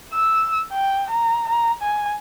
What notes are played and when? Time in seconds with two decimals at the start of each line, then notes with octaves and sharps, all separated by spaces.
0.14 E6
0.73 G5
1.11 A#5
1.49 A#5
1.83 G#5